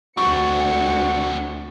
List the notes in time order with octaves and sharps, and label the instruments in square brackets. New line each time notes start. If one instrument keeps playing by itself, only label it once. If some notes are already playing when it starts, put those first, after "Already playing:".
[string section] D2 C#7 [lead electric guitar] C4 D4 [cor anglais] F#4 [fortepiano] C#6